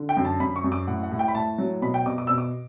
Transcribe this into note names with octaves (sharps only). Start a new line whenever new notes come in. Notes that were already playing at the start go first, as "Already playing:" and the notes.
Already playing: D3
G5
F#2
A5
F#2 B5
C#6
F#2
D6
A2 F#5
F#5
A2
G5
B5
A2 A5
F#3
B2 B5
G5
B2 D6
D6
B2 E6
D6